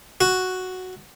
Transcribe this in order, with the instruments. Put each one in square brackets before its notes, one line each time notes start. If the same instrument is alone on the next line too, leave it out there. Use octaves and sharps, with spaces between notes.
[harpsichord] F#4